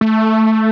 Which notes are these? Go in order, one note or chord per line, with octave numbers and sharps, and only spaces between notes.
A3